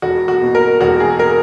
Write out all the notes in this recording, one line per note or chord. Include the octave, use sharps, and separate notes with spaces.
E1 F#4
F#4
B2
A#4
E1 F#4
G#4
A#4